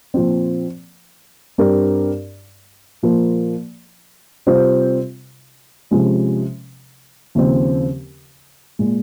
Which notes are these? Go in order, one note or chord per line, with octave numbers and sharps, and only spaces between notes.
A#2 F3 C4
G2 G3 C4 G4 A#4
A#2 F3 A#3
C3 G3 C4 F4 C5
C3 F3 G#3 C#4
D#2 C#3 F3 C4
A#2 G#3